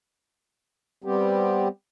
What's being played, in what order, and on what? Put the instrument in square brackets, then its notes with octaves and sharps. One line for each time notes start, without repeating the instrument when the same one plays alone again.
[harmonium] G3 B3 C4 G4